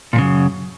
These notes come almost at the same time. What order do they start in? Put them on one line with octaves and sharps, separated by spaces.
A#2 F3 C#3 F#2